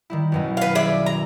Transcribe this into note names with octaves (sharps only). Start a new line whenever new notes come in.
D#3 G3 E4
B1 F#2 B2
B4 F5
G#4 D5 E5
A#5